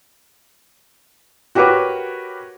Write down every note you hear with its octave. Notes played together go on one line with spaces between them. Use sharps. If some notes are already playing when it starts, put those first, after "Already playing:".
F#4 G4 A#4 B4 C#5 D6